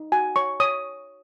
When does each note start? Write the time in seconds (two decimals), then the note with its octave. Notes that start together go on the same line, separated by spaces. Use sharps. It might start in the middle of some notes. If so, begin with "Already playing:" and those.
Already playing: D#4
0.12 F#4 G#5
0.36 C#5 C#6
0.60 C#5 D#6